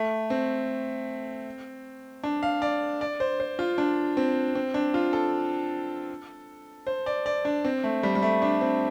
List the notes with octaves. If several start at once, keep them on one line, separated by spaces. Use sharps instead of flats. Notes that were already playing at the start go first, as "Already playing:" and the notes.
Already playing: A3
C4
D4
F5
D5
D5
C5
C5
F4
D4
C4
C4
D4
F4
A4
C5
D5
D5
D4
C4
A3
G3
G3
A3
D4
C4